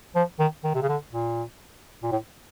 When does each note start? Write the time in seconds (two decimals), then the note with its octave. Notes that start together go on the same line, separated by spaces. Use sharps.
0.15 F3
0.39 D#3
0.64 D#3
0.75 C3
0.82 C#3
0.89 D3
1.13 A#2
2.03 A#2
2.11 A2